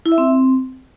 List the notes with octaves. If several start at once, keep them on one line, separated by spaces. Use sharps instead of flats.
E4
E5
C4